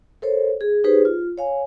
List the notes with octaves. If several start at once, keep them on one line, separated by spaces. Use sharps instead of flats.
A4 A#4 C5 C#5
G#4
D#4 G4 G#4 B4 C5
F4
C#5 F5 G#5